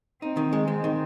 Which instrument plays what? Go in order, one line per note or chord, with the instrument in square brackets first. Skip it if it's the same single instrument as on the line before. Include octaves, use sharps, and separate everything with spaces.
[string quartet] C4 [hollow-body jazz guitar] D#4
[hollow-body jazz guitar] D#3
G#3
[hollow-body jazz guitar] G#3 [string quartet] C4
[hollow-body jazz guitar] D#3